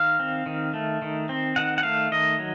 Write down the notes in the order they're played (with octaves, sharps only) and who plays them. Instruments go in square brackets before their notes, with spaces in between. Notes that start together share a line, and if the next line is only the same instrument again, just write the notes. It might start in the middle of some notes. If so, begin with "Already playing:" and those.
Already playing: [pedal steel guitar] D#3 F5
C4
D#3
A3
D#3
C4
D#3 F#5
F#5
A3 F5
D#3 D#5
F#3